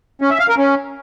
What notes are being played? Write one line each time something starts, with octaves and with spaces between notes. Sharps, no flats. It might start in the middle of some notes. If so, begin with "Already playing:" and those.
C#4
E5
F5
A#4
C#4